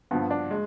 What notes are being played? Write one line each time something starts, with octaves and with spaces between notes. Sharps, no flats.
G2 F3 B3
D4
G#3